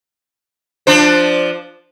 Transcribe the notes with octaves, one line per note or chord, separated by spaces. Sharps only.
F3 D4 C5